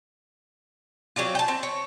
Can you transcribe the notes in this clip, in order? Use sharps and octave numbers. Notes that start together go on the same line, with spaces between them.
F#3 C4 D4 F4
G5 A5
C4
C#5